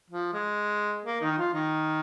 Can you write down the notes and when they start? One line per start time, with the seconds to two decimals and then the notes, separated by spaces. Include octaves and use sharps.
0.10 F3
0.34 G#3
1.06 A#3
1.21 D#3 D#4
1.32 D#4
1.38 F3 F4
1.54 D#3 D#4